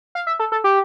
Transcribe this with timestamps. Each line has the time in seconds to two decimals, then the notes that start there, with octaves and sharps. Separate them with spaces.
0.15 F5
0.27 E5
0.40 A4
0.52 A4
0.64 G4